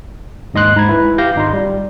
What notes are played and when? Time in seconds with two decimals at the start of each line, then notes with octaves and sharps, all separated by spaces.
0.54 D#2 G#2 D#5 C6 F#6
0.76 G#2 A#5 B5 G#6
0.89 E4 B4
1.18 G4 F5 D6 G6 A#6
1.36 G#1 D#4 F4 C6
1.53 G3